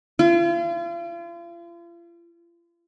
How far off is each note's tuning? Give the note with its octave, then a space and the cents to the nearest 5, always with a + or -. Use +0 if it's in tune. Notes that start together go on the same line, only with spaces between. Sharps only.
F4 -40